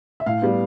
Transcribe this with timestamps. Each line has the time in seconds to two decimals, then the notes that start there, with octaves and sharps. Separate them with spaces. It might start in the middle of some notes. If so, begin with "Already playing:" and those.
0.20 E5
0.26 A2 F5
0.42 G3 B3